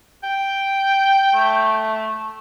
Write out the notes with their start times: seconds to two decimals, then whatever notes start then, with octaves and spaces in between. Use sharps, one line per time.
0.23 G5
1.34 A3